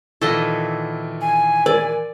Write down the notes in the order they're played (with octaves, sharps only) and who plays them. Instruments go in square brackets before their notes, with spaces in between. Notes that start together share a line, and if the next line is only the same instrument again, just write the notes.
[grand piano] A#2 D#3 E3 [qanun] A4 D#5
[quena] G#5
[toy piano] A#4 [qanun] D5